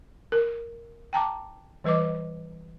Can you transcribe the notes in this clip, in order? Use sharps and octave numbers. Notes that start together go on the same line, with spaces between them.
A#4
G5 A5 A#5 D6
E3 G3 B4 D#5 D6